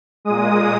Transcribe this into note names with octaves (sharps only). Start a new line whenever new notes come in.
A#2 G#3 D#6